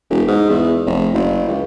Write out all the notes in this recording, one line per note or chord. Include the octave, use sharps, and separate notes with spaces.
E1
G#2
E2
F1
F#1
C#2